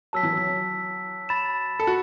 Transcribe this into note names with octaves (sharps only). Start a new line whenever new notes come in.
F#3 A5 E6 B6
E3
F#3
B5 A6 E7
A4
F#4